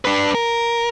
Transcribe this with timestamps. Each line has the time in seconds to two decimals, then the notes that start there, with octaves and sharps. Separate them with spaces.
0.05 D4 B4
0.35 A#4